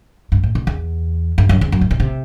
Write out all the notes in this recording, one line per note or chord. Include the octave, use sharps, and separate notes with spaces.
G2
A2
B2
E2
G2
F#2
E2
F#2
G2
B2
C3